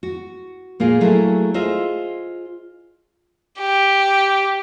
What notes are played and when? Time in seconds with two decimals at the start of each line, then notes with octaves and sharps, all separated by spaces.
0.03 F#4
0.80 A#2 A#3 F4 G#4
1.01 F#3 A3 A#3 E4 G#4
1.54 F4 G#4 C5 D#5 E5
3.59 G4